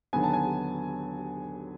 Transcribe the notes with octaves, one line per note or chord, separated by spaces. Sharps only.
D#2 D3 F#3 B3 G#5
A5
G#5